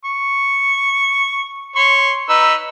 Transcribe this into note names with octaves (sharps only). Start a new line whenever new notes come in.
C#6
C#5 C6 C#6
D#4 B4 E6